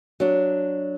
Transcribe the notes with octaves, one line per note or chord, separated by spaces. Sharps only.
F#3 D4